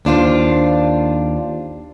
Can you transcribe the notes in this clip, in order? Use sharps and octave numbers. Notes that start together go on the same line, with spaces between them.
D#2 D4 F4 C5